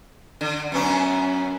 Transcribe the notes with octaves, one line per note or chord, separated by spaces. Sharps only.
D3
F#2 B3 C#4